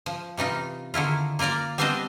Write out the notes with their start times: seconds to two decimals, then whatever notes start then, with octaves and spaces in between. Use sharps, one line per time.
0.06 F3
0.37 C3 E3 D#4 F4
0.94 D3 D#3 E4 F4
1.39 A#3 F4 A#4 D5 A#5
1.78 G3 B3 C4 D4 C5 D#5